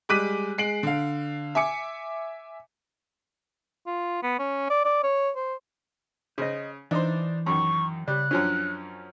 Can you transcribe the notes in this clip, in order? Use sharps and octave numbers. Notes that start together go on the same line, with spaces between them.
G3 G#3 D6 F#6 B6 D#7
G#3 C7 D7 F#7
D3 F5
E5 G#5 D6 C#7
F4
B3
C#4
D5
D5
C#5
C5
C#3 C5 D#5
E3 D4 D#4 C5
F#2 D#3 C#6
C#3 G3 F#6
F#2 F3 C#4 D4